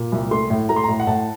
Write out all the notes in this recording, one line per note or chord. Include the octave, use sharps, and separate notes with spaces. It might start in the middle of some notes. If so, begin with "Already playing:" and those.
Already playing: A#2
C2
A3 C6
A2
A3 A#5
C6
A#5
A2
F#5
A2 A5